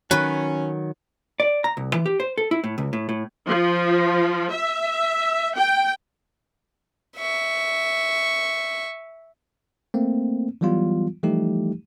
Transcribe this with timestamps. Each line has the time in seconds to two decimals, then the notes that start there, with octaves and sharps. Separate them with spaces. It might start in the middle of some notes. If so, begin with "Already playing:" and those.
0.11 D#3 F#3 C#4 B4
1.40 D5
1.64 A#5
1.77 C2
1.94 E3
2.06 G4
2.20 C5
2.38 A4
2.51 E4
2.64 A2
2.78 C#2
2.93 A2
3.09 A2
3.47 F3
4.52 E5
5.56 G5
7.17 E5 C#6
9.94 A3 A#3 C4
10.61 E3 F#3 G3 B3 F4
11.23 E3 F3 G3 A3 D#4 G4